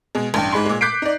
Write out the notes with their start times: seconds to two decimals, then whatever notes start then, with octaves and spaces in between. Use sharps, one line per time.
0.15 B2 G#3
0.34 A1 G2 G5
0.52 G#2 G#3 B5 C6
0.66 A#2 G#3
0.81 D6 F#6 G6 B6 C7 D7
1.02 D#4 D5